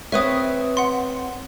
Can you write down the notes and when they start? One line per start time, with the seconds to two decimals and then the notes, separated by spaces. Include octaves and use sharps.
0.12 C4 B4 C#5 E5 D#6
0.77 F#5 C6